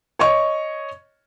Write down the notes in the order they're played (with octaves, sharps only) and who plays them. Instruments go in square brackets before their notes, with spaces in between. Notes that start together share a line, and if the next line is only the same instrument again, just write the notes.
[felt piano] C#5 D#5 C#6